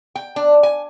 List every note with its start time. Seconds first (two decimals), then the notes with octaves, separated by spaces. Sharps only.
0.15 G5
0.36 D4
0.63 G#5